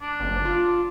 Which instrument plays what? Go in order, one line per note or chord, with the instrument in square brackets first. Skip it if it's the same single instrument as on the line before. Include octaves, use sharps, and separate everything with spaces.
[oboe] D4
[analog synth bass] F#1
F4